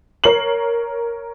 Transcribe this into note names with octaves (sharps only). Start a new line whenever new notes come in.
A#4 C#5 C7 F#7